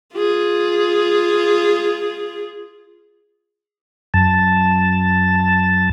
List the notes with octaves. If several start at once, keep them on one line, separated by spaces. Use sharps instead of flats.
F4 G#4
F#2 A5